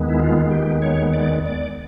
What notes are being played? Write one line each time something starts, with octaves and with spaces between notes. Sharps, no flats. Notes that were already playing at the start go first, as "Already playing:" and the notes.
Already playing: D#2 D#3 G#3 B3
E4
F4
G4
C#5
D5
D5